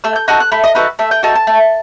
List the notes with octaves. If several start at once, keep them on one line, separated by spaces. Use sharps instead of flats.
A3 E6
G6
D#4 F#4 A4 F#6
F#6
A3 B5
D#5
D#4 F#4 A4 B4
A3 E5
G5
D#4 F#4 A4 A5
A5
A3